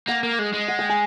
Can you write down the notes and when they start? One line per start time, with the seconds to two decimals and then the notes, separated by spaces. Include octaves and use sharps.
0.07 A#3 F#5
0.23 A#3
0.39 G#3
0.54 G#3
0.68 F#5
0.79 G5
0.89 G#5